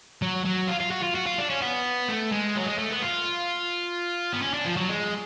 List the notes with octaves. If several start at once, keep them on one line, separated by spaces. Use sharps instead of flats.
F#3
F#3
F4
F4
F#4
F4
F#4
F4
D4
C#4
B3
A3
G#3
F#3
G#3
A3
B3
F4
B3
C#4
D4
F3
F#3
G#3